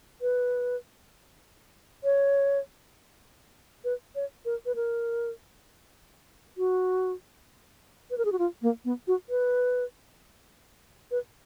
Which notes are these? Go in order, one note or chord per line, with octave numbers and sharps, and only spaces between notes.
B4
C#5
B4
C#5
A#4
B4
A#4
F#4
B4
A#4
G#4
F#4
F4
A#3
B3
F#4
B4
B4